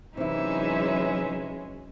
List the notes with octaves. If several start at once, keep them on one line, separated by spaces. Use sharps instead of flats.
C3 E3 F#3 G#3 C#4 D#4 E4 E5